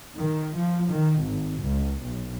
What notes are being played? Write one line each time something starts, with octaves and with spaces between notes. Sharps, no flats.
D#3
F3
D#3
G#1
C#2
B1